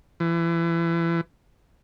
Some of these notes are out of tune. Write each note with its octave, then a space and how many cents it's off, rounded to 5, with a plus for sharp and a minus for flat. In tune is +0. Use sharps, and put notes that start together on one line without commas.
E3 +30